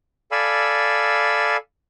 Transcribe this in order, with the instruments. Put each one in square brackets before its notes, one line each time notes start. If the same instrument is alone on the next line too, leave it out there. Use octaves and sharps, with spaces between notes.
[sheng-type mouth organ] A4 D5 F5 G#5 B5 E6